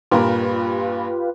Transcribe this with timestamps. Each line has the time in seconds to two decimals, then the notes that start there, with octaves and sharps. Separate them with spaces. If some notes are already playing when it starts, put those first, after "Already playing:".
0.11 G2 A#2 F4 G4 A#4 B4